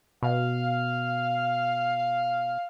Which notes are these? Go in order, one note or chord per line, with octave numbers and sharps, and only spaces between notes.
B2 F5